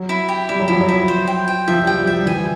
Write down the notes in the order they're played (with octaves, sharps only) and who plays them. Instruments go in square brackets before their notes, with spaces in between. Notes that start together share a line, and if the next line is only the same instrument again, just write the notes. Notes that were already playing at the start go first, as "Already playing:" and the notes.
Already playing: [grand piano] F#3
[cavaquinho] E4
G4
[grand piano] G3 [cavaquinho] E4
[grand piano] F#3
[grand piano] F3 [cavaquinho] E4
[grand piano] F#3
[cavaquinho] E4
C5
G5
G5
[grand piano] F3 [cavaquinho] E5
[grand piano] G3 [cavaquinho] G5
[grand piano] G3
[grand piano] G3 [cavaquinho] E5
[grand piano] E3 [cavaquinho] G#5